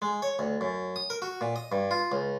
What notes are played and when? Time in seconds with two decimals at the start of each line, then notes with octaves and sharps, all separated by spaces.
0.02 G#3
0.22 C#5
0.39 D2
0.61 F#2
0.96 D#6
1.10 A#4
1.22 F#4
1.41 A#2
1.56 D#5
1.72 G2
1.91 F4
2.12 C#2